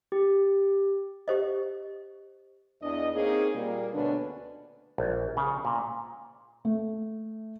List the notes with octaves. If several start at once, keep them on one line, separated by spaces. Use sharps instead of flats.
G4
G4 C5 D#5
E2 D4 D#5
A#3 C4 C#4 D#4 G#4
A#2 G3 A#3
D2 B2 D3 C#4 D4 B4
A#1
C#3
A#2
A3